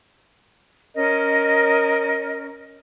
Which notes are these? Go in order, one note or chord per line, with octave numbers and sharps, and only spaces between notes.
C#4 A#4 D#5